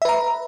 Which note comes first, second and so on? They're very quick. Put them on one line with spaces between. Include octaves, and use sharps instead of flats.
E5 B4 A#5